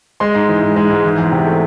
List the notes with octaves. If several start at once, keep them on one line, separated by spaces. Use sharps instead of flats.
G#3 C6
G#2
E3
G#2
G#3
G#2
E3
E2
C3
A3